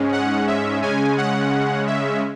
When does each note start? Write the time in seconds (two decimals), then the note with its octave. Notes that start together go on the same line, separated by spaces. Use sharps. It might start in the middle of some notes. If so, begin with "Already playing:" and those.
Already playing: G#2 G#3 C#4
0.12 F#5
0.47 E5
0.82 C#3 G#3 C#4 G#5
1.18 F#5
1.87 E5